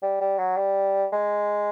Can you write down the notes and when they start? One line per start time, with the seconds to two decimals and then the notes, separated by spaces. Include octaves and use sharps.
0.03 G3
0.21 G3
0.39 F#3
0.57 G3
1.13 G#3